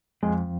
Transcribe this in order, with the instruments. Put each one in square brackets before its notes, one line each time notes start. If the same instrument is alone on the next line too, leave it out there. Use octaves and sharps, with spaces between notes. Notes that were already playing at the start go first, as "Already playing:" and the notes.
[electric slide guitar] F2 [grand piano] G#3